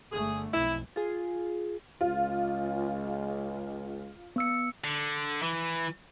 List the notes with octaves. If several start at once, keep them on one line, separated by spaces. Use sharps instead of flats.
G1 D3 A3 G#4
B1 F2 E4
F4 G#4
C#2 G#3 F4
B3 E6 C#7
D3
E3